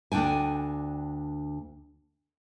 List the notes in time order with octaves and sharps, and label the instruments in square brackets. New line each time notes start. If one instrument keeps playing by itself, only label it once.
[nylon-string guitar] D2 D4 G5 G#5